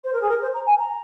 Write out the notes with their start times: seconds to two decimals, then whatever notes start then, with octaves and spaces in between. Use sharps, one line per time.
0.04 C5
0.12 A#4
0.21 G#4
0.28 A#4
0.41 C5
0.54 A#5
0.66 G#5
0.79 A#5